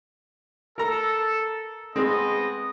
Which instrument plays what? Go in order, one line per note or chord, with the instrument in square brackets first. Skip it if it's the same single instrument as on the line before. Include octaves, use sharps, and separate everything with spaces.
[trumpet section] A4 [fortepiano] A#4 A#5
[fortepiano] G#3 C4 [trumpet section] B3 D#5